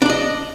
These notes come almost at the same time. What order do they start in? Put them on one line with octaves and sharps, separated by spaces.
D4 D5 D#5